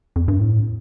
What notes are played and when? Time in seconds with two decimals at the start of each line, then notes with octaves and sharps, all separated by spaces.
0.16 F2
0.28 G2
0.41 A2